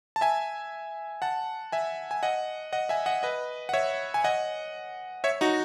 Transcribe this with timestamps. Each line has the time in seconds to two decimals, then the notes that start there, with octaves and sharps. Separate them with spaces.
0.16 A5
0.21 E5 G#5
1.22 F#5 A5
1.72 E5 G#5
2.11 G#5
2.23 D#5 F#5
2.73 D#5 F#5
2.89 E5 G#5
3.06 D#5 F#5
3.23 B4 D#5
3.69 F#5
3.73 C#5 E5
4.14 G#5
4.24 D#5 F#5
5.24 C#5 E5
5.41 D#4 F#4